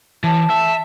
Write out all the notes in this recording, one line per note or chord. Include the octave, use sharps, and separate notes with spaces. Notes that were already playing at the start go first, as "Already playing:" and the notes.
E3 A5
E5